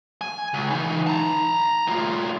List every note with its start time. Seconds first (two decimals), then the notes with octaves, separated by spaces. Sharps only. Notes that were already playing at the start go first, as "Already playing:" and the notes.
0.21 G#5
0.54 C#2
0.70 E3 D#4
1.07 A5 A#5
1.88 A2 F4